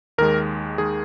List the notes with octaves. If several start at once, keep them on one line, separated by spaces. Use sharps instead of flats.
D#2 D#3 G#3 A#4
D#2 D#3 G#3 G#4